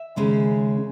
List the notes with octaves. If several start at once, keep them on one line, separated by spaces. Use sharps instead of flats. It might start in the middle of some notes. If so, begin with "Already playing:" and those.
Already playing: E5
D#2 C#3 G#3 C#4